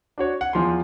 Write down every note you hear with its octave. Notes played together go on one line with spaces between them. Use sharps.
D4 F#4 C#5
F#5
E2 F3 C6